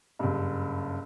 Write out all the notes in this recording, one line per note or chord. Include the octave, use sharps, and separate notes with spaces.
F#1 G2